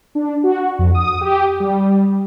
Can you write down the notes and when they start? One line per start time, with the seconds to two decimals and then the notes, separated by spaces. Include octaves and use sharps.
0.15 D4
0.44 F#4
0.79 F2
0.94 D#6
1.21 G4
1.60 G3